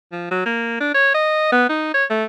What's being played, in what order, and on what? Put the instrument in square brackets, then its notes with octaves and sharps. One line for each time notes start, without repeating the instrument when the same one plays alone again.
[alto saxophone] F3
F#3
A#3
D4
C#5
D#5
B3
D#4
C#5
A3